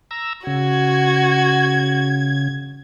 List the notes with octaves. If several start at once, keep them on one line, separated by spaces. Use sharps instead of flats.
A#5 E6
C#3 F#4 G#6